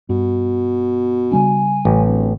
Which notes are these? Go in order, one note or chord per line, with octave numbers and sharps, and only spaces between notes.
G2 B2
C#3 G3 D4 G#5
A1
D1